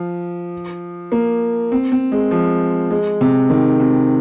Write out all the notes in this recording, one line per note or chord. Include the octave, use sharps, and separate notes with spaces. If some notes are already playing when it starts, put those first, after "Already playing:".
Already playing: F3
A#3
C4
C4
G#3
F3
G#3
C3
D#3
C3